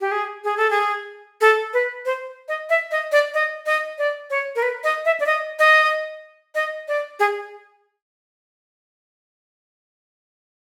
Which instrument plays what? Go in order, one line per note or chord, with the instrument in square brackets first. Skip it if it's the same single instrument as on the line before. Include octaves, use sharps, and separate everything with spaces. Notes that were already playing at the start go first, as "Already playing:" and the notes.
[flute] G4
G#4
G#4
A4
G#4
A4
B4
C5
D#5
E5
D#5
D5
D#5
D#5
D5
C#5
A#4
B4
D#5
E5
D5
D#5
D#5
D#5
D5
G#4